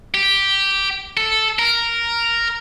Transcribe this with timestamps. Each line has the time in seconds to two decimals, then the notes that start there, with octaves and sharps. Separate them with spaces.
0.14 G4
1.17 A4
1.59 A#4